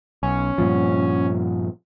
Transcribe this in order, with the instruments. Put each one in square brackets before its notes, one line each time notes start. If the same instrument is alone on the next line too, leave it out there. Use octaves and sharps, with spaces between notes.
[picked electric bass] B1 [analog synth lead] C#4
[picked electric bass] G2 A#2 F3